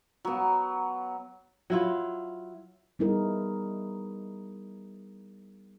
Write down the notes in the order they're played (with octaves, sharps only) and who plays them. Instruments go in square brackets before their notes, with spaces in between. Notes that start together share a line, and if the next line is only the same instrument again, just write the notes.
[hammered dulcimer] F#3 B3
[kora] F#3 E4 F4
[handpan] G3 B3 D#4 E4 G#4 A#4